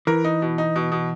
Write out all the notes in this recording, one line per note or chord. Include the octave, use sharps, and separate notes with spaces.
E3 A#4
D#4
B2
D#4
B2
B2